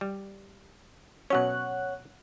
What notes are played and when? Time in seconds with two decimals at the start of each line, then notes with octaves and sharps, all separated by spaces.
0.01 G3
1.30 B2 F#3 C#4 C#5 F#5 F#6